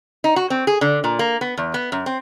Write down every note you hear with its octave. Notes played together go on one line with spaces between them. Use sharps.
D#4
F#4
C4
G#4
D3
A#2
A#3
B3
E2
B3
F#2
C4